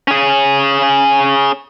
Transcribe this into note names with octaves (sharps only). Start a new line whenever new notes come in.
C#4 G#4